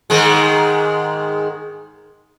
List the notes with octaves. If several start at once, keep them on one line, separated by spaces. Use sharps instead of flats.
G#2 D#3 G#3